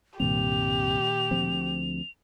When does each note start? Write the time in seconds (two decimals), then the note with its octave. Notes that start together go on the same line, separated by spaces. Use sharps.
0.20 C2 G2 A#2 D#3 A#3 C4 G4 F7
1.31 D2 F3 C4